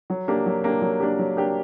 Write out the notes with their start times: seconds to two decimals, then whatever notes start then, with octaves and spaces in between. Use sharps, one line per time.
0.10 F#3
0.28 A#3 D4 G4
0.46 F#3
0.64 A#3 D4 G4
0.82 F#3
1.00 A#3 D4 G4
1.19 F#3
1.37 A#3 D4 G4